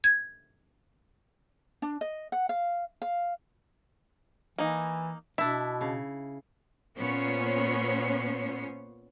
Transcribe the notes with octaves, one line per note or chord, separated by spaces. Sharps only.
G#6
D4
D#5
F#5
F5
F5
E3 A#3 D#4
B2 D4 E4 E5
C#3
A#2 B3 C#4 C5 C#5